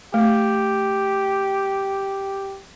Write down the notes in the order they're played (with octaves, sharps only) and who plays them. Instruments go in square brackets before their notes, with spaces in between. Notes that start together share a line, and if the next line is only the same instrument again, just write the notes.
[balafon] A3 [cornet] G4